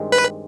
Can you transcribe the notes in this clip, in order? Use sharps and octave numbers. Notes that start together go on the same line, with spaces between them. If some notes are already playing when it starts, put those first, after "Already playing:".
Already playing: G2 D#3 G#3 C4
B4